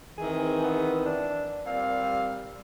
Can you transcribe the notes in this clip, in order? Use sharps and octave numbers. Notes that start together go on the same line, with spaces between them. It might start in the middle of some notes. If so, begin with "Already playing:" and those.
D#3 E3 C4 G#4
B3
D4
A#2 G3 C4 F5